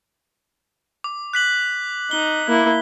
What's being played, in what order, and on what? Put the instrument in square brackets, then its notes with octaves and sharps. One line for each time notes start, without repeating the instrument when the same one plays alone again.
[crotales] D6
F#6 B6 F#7
[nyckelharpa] D#4 [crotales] G7
[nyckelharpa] A#3 E4